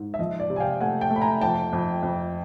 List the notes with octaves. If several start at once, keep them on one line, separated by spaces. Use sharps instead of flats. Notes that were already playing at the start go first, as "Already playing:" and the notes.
Already playing: G#2
E5
F3 D#5
D5
C3
G#5
F5 G5
A3 F#5 G#5
G5 A5
A3
B5
G#5 A#5
F2 G5 A5
F2
F2